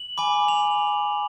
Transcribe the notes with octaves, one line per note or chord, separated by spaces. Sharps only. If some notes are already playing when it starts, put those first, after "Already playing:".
Already playing: F#7
G#5 B5 D6
F7